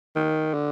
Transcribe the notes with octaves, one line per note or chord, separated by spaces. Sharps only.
D#3
D3